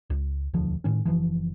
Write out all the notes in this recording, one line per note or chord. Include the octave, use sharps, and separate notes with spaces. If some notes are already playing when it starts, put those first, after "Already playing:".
C#2
E1 D2 F3
A2 D#3 C#4
F#1 E2 E3 F3